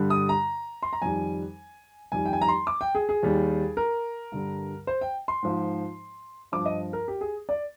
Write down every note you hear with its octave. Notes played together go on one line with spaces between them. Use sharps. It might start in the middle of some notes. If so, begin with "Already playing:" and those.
Already playing: G2 D3 G3
D#6
A#5
C6
A#5
F2 D#3 G3 G#5
F2 D#3 G3 G#5
G5
G#5
A#5
C6
D6
G5
G#4
G#4
D#2 D#3 G3
A#4
G2 D3 G3
C5
G5
C6
G#2 F3
G2 F3 D6
D#5
A#4
G4
G#4
D5